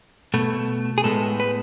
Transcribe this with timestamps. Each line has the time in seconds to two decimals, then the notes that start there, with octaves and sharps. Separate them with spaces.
0.34 B2 A3
0.98 G#4
1.04 A2 G#3 B3 A4
1.40 B4